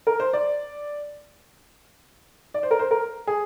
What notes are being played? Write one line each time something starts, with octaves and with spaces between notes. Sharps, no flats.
A#4
C5
D5
D5
C5
A#4
C5
A#4
G#4